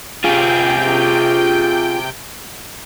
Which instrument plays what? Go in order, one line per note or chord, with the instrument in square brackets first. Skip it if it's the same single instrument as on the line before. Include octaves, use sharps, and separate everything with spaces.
[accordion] C3 G5 G6 [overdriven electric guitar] F4 G#4